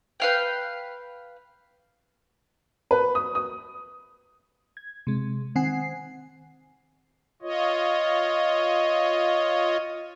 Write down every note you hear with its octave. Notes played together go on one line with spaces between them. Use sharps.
B4 F5 G5
B4
D#6
D#6
G#6
C3 G#3
D#3 C4 F#5 G#5 C7
F4 C#5 D#5